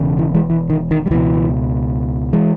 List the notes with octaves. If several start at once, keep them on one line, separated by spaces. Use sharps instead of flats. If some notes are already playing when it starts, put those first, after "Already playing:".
Already playing: E1 E2 C#3
E3
E3 G#3
E3
D#3
D#3
G3
C#2 B2 E3
E3 G#3